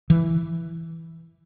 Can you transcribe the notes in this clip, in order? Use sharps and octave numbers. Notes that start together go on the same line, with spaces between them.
E3